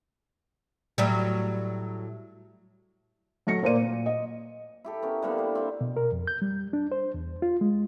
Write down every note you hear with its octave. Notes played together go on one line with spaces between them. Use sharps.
A2 F#3 G3
F#3 A3 A#6 C#7
A#2 A#3 C5 D5 D#7
A#2
D#5
E4 G4 A4
B3 C#4 A#4
D3 G3 A#3 B3
C5 D5
C4 E4
B2
A#4
F2
G6
G3
D4
C5
E2
F4
G#3